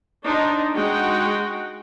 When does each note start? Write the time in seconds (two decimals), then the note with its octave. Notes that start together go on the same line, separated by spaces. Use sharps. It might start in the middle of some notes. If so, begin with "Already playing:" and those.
0.24 D4 D#4 C5
0.74 G#3 D#4 F#4 G#4 F#5 G5